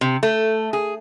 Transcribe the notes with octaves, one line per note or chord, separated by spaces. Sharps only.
C3
A3
G#4